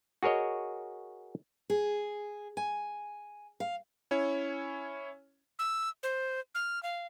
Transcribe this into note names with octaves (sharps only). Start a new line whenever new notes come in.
F#4 G#4 A#4 C#5 D#5
G#4
G#5
F5
C#4 E4 C#5
E6
C5
F6
F5